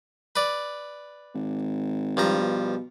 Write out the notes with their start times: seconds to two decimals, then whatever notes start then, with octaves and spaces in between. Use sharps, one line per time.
0.36 B4 D5
1.35 G#1
2.17 G2 F3 A#5
2.39 B2